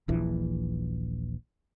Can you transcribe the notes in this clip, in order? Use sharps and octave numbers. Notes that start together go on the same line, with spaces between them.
D#1 A#1 E3